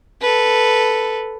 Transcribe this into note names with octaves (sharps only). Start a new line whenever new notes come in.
A4 B4